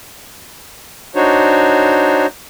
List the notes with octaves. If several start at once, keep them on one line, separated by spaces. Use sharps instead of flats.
D4 D#4 F#4 C5 C#5